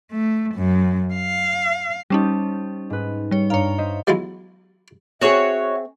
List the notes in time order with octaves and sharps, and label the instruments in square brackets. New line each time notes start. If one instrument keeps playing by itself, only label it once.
[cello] A3
F#2
F5
[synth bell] G3 C#4 D#4 [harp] G4 C5 A5
[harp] G#2 B4
[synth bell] G3 C#5
[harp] G2 A#5 D7 [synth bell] C#5 F5
[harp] C5 D#5 E5
[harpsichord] E3 F#3 G#3 B3 E4 F4
[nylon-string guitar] C4 G#4 [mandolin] F#4 C#5 [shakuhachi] E5